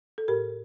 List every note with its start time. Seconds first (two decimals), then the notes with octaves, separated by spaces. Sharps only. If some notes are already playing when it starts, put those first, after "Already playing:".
0.18 A4
0.28 A2 G4 A#4